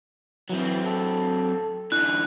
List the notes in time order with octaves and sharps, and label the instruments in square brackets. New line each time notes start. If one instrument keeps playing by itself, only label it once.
[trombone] E3 [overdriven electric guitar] F#3 C4
[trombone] A4
[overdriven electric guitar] D3 E3 [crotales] F#6